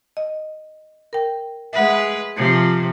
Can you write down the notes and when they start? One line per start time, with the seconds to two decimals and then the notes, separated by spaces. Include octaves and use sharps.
0.17 D#5
1.13 A#4 G5
1.73 G#3 B4 E5 F#5
2.36 C3 F3